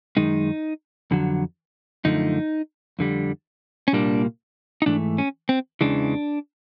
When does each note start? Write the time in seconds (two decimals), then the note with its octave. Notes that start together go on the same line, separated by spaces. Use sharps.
0.17 F#2 D#3 G#3 D#4
1.11 F2 D3 F#3
2.05 F#2 D3 F3 A3 D#4
2.99 F2 D3 G3
3.88 C#4
3.93 C2 A#2 G3 A#3 D4
4.82 D#4
4.86 G#2 E3 A3 D4
5.18 C#4
5.49 C4
5.81 E2 C#3 E3 G#3 D4